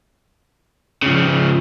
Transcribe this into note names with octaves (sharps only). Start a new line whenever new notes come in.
C#3 F3